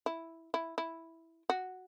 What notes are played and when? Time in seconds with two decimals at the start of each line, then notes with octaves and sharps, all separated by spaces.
0.06 E4
0.54 E4
0.78 E4
1.50 F#4